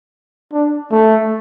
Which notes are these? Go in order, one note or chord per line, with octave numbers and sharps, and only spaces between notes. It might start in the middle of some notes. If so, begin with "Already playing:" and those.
D4
A3